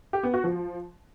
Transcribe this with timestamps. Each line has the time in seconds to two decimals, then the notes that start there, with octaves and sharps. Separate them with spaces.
0.13 G4
0.23 B3
0.34 F#4
0.44 F3